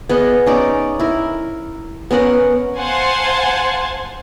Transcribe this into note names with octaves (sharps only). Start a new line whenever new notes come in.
B3 G#4 D#5 F#5
C#4 D#4 D5
E4 A#4
B3 C#4 A#4 F#5
C5 F5 F#5 G#5 A5 C6